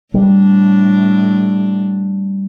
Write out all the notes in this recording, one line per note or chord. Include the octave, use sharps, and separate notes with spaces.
A2 G3 D4